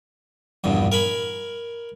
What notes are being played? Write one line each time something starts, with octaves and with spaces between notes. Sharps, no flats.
A#1 E2 G2 B2
A#4 G#5 B5